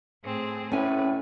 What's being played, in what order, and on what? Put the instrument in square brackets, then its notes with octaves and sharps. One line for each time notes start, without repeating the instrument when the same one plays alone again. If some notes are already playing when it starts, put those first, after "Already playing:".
[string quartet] A2 C4 G#4
[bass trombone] A2 [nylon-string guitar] C#4 G#5 [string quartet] B4